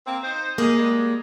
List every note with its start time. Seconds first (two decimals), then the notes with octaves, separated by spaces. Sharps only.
0.07 A#3 C4
0.23 D#4 C5
0.58 G#3 A#3 G#4
0.77 G3 G#3